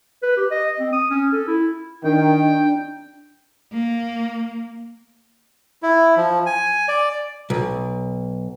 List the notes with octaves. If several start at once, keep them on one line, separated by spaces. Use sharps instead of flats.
B4
G4
D#5
C4
D#6
C#4
A4
E4
D#3 D4 G5
A#3
E4
F3
G#5
D5
B1